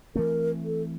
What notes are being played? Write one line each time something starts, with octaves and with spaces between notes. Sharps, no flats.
E3 A3 C4 A#4
A4